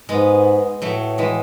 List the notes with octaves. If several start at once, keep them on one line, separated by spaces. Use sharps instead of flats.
G#2 G#3 B3
A2 F#3 A3
E3 G#3